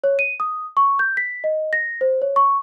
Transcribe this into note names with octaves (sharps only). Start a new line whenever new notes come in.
C#5
D#7
D#6
C#6
G6
B6
D#5
A#6
C5
C#5
C#6